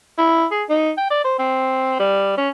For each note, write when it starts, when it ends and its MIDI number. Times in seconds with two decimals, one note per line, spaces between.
0.18 0.46 64
0.51 0.64 68
0.69 0.92 63
0.98 1.08 79
1.10 1.23 74
1.24 1.37 72
1.39 1.98 60
2.00 2.36 55
2.37 2.49 61